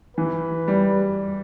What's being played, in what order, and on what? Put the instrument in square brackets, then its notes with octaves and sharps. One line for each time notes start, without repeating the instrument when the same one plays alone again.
[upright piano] E3 [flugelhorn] B4
[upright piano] G3